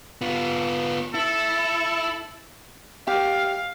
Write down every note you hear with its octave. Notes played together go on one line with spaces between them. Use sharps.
B3 F4
E4 A4
G4 F5